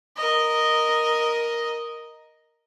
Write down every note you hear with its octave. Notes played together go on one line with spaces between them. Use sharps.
A#4 D#5